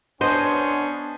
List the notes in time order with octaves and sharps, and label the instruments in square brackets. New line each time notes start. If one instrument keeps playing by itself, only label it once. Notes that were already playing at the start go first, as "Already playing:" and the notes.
[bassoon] B3 [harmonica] C#4 [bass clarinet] D4 [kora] C5 D#5